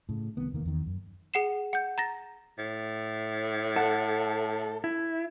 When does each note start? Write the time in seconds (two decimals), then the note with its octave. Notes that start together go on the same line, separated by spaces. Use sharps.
0.09 A2 C#3
0.37 C2 D#3 B3
0.52 F1 E2 D#3 A#3
0.65 E2 D#3
0.86 F#2
1.34 G#4 F#5 C7 E7
1.73 F#5 G6
1.98 A#5 A6 A#6
2.58 A2
3.76 A4 F#5
4.84 E4